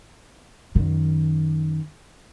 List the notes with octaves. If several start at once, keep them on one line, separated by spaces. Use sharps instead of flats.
F#2 D#3